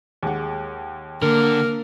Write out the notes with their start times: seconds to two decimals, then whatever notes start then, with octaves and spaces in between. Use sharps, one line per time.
0.23 D#2 G#3 F#5
1.22 D3 A#3 A#4